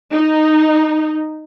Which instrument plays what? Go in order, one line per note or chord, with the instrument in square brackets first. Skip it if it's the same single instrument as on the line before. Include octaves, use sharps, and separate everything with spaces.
[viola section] D#4